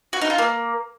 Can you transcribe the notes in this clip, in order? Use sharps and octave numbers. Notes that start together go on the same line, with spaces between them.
F#4
D#4
F4
A#3